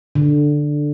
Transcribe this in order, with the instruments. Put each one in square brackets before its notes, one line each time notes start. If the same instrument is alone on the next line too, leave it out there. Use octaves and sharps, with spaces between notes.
[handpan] D3